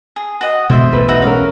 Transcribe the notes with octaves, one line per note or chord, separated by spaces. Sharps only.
G#4
F#4 D#5 F#5
B2 D3 G#3 C5 E5
B1 E2 A3 B4
D#4 F#4 E5
C#4 A#4 F5